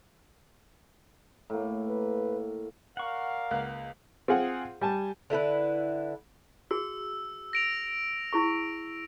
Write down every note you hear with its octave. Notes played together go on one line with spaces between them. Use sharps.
A2 A#3
B4
A#4 D5 F5 F#5 C#6
C#2 A#3 F#6
C4 F4 G#4 F#5
G3 G#5 A5
D3 E4 A#4 B4
F#4 G#4 E6
A#6 D7 F7
E4 G#4 C#6